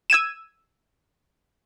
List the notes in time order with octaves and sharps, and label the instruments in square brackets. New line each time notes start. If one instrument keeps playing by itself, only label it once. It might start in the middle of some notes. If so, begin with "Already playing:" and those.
[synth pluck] E6 G#6 D#7 E7